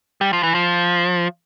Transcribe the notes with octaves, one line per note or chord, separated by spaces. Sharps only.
G3
F3
E3
F3